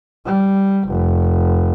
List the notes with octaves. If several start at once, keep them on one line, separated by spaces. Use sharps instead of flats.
G3
F1